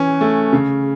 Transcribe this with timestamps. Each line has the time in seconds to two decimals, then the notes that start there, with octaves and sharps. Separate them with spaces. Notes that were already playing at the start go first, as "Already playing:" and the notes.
Already playing: E3 C#4
0.21 A3
0.53 C#3